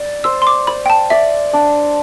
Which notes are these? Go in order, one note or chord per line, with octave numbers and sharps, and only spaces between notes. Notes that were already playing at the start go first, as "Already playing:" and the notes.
Already playing: D5
C5 E6
C6
D6
C5 B5
G5
A5
D5 E5
D4